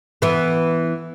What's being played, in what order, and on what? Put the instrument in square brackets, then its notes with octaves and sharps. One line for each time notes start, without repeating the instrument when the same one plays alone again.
[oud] E3 B3